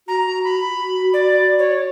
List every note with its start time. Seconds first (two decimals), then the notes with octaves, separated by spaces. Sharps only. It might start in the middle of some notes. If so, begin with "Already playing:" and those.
0.08 F#4 A#5
0.44 B5
0.62 F#4
1.13 D5
1.59 C#5